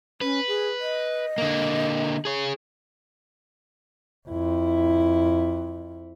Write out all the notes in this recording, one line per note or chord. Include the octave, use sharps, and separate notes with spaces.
C#4 B4
G#4
D#5
D3 A#3
G#4 C#5
F2 E4